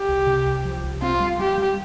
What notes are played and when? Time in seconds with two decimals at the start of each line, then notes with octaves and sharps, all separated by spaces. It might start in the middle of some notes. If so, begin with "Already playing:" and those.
Already playing: G4
0.08 C2
0.27 C3
0.46 C2
0.65 F3
0.84 C2
1.02 C4 F4
1.20 G3
1.39 G3 G4
1.58 G3